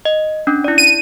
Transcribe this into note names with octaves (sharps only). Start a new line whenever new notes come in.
D#5
C#4 D4
E4 D5
D#7